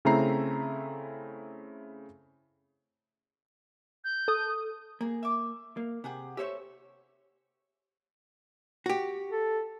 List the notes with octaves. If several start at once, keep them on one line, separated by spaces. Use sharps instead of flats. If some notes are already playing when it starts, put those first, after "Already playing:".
C#3 A3 C4 E4 A#5 C7
G6
A4 D#6
A#3 G#4
E5 D6
A#3
C3 G4 G#4 F#5
A3 G4 C5 C#5 E5 E6
F#4 G4
A4